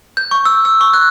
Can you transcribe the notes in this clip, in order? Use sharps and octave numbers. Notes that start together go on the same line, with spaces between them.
G6
C#6
E6
E6
C#6
F#6